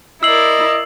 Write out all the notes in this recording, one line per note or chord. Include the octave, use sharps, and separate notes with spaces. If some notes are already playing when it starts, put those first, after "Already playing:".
E4 A#4 D5 D#5 E6 C7 F#7